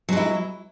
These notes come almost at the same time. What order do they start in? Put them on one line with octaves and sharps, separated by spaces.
F#3 G#3 E4